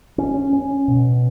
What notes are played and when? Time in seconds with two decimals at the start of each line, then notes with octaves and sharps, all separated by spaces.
0.18 C#4
0.53 C#4
0.88 B2